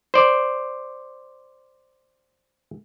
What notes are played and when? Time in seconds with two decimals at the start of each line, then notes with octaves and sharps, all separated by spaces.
0.14 C5 D5